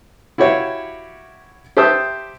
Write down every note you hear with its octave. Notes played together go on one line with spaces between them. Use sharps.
E4 F#4 G4 C#5 E5 F5
G4 C5 E5 A5 D#6 E6